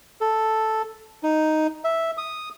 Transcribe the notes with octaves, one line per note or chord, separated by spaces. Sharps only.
A4
D#4
E5
D#6